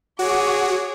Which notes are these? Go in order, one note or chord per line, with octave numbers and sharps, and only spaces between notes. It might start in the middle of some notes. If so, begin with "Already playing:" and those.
F#4 G#4 C#5 D6